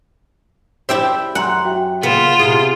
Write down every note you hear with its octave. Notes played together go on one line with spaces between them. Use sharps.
E4 G4 C5 D5 E5
F#2 F#5 G#5 A#5 C6
F#4 E5 G5
C#3 A#3 B3 F4 B6 E7
C3 E4 G#4